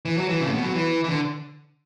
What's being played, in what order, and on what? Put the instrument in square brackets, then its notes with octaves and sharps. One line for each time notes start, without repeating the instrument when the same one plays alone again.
[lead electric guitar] E3
F#3
E3
C#3
A2
B2
F#3
E3
E3
D3